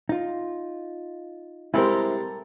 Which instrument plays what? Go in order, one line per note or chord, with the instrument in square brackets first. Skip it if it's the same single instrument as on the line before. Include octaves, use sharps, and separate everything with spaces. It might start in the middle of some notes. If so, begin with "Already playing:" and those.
[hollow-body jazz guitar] D#4 F4
[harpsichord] C3 G#3 C4 [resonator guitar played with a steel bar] G3 A4 A#4 [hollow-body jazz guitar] E4 C5